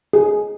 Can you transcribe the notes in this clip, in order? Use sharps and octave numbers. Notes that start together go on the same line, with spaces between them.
G#4